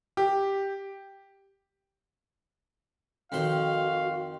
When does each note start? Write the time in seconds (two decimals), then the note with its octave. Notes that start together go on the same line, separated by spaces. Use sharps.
0.17 G4
3.32 F2 D#3 F#4 C5 F5